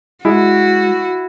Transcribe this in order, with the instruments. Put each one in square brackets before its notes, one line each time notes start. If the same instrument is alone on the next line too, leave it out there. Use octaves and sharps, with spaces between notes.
[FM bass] G#3 [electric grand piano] E4 [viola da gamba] F#4